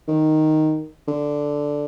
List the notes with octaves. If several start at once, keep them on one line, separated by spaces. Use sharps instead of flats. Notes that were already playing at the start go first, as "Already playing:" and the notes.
D#3
D3